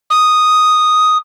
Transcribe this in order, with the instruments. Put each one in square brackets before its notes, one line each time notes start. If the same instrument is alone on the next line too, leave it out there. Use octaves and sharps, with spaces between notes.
[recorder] D#6